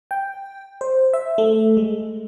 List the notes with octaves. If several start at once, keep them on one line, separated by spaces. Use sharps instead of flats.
G5
C5
E5
A3
G#3